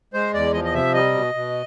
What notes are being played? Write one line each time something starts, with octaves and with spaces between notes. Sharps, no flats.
G#3 C5
E2 D5
F3 D#5
D#5
C3 E5
G3 D#5
B2
B2